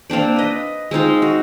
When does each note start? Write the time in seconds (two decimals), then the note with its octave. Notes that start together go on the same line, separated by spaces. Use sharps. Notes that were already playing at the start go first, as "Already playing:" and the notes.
0.10 A#3 C4 D4 D5
0.36 B4 D#5
0.91 G#3 C4 D#4 F4
1.22 F#4